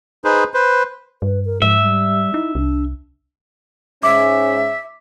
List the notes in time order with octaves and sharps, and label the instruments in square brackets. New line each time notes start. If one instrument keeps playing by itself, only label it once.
[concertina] D#4 G#4 B4 C5
B4 C5
[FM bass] G2 [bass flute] B4
[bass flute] A#4
[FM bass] G#2 [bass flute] F3 [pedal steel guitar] E5
[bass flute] G3
[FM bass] D#4 [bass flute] E4
[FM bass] C2 [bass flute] D4
[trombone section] G#2 C#4 [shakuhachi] E5 [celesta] D6